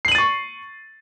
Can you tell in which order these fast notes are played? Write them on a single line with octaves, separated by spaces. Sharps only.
C7 F#7 D#7 A6 C#6